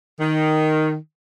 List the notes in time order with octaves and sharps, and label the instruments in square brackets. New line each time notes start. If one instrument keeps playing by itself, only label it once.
[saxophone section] D#3